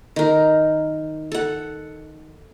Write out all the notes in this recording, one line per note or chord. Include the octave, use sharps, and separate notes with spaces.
D#3 A#4
A4 F#5